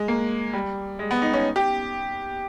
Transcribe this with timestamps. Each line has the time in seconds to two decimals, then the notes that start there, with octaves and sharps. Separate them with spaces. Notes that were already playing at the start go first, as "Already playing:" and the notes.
Already playing: G#3
0.08 A#3
0.53 G3
0.99 G#3
1.11 B3
1.22 D#4
1.33 C#4
1.56 G4